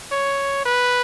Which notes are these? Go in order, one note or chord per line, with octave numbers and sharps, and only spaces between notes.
C#5
B4